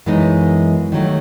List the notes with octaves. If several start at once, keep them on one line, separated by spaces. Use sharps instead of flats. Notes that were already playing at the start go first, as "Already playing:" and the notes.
F#2 E3 G#3 B3 D#4
D#2 D#3 F#3 A3